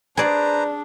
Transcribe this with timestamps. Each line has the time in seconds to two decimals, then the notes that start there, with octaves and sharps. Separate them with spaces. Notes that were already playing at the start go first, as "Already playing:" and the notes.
0.17 D4 G#4 B4 C5 D5 A#5